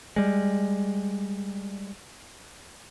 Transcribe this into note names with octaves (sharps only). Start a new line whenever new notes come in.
G3 G#3